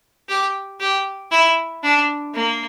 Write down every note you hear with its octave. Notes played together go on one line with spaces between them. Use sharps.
G4
G4
E4
D4
A#3